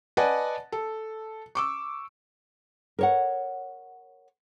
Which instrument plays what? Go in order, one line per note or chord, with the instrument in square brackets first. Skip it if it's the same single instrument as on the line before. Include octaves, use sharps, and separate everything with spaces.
[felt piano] B4 D5 D#5 F#5 G#5 A5
A4
C#6 D6 E6
[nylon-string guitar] A#4 C#5 F#5